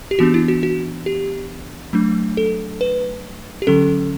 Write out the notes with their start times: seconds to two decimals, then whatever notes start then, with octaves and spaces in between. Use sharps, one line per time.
0.11 G4
0.19 E3 B3 D4 F#4
0.34 E4
0.48 F#4
0.63 F#4
1.06 G4
1.93 F#3 A3 D4
2.37 A4
2.81 B4
3.62 G4
3.67 D3 F#3 C#4 A4